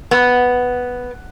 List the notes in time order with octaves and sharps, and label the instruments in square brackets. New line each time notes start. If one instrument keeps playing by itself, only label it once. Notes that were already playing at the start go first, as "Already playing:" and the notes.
[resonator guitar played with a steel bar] B3